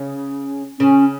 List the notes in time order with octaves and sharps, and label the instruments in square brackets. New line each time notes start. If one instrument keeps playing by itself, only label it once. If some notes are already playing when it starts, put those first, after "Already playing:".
Already playing: [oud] C#3
[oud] C#3 [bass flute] C#4